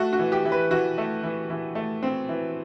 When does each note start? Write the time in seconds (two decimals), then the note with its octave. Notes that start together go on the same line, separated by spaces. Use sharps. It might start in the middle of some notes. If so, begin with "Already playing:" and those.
Already playing: A3 F#4
0.13 F#4
0.19 E3
0.32 G4
0.45 E3
0.52 B4
0.71 E3 F#4
0.98 A3
1.23 E3
1.50 E3
1.75 A3
2.03 C4
2.29 E3